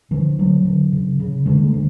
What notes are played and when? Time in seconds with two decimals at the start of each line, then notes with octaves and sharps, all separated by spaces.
0.11 D3 F3
0.39 D3 F#3
0.65 D3
0.93 C#3
1.20 C#3
1.46 D3 G#3
1.64 A3
1.74 D3